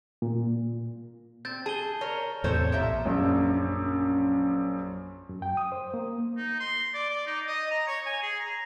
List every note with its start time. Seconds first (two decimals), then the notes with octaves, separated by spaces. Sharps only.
0.22 A#2
1.45 C4 G6 A6
1.66 G#4 A5 D#7 G7
2.01 A#4 C#5
2.44 E2 A2 C3 A4 C5 C#5
2.72 A#1 F3 A#3 E5
3.05 A#1 F#2
5.29 F#2
5.42 G5
5.57 D#6
5.72 C5
5.94 A#3
6.38 D#4
6.61 C6
6.94 D5
7.10 D5
7.27 D#4
7.48 D#5
7.71 A#5
7.88 C#5
8.06 G#5
8.23 G#4
8.40 A#5